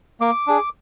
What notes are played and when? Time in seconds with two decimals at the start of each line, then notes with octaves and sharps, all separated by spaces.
0.21 A#3 D6
0.47 D4 G#4